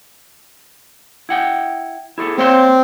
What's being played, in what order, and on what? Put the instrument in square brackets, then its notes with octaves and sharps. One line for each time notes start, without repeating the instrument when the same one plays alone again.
[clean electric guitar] E4 F#5 G5
E4 G#4 A4
[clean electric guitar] A#3 C#5 C6 [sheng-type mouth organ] C4